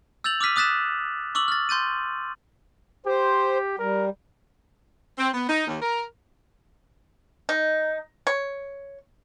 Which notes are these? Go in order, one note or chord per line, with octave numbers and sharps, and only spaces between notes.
E6 G6 A6 F7 F#7
D6 E6 F6 B6 D#7
D6 D#6 F#6 A6 B6 E7
C#6 D6 E6 F#7
F6 A6
C6 G6 A6 D#7
G4 C5
G3 A#4
C4
B3
D#4
D#2
A#4
D#4
C#5